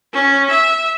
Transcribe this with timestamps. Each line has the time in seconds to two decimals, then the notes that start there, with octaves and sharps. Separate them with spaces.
0.14 C#4
0.50 E5